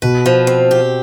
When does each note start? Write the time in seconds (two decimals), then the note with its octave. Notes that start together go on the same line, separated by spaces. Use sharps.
0.02 B2 B4
0.26 F3
0.47 C4
0.71 G4